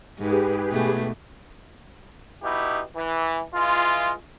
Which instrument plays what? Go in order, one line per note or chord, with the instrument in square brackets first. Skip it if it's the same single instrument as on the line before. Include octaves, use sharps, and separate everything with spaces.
[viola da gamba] G#2 [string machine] G4 G#4 B4
[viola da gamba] B2 A3
[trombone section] B2 D#4 E4 G4
E3
E3 G#3 F4